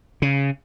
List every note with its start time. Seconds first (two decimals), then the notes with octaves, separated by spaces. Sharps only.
0.22 C#3